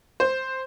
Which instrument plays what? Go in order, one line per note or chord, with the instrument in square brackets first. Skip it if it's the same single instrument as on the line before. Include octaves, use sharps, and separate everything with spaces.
[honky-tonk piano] C5